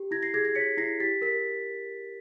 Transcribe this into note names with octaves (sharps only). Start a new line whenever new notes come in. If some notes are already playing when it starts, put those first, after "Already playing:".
Already playing: G4
E4 G#6 A#6
A#6 C7
G#4 G#6 A#6
G#6 A#6
C#5 B6 C#7
E4 A#6 C7
G4 A6 B6
A#4 B6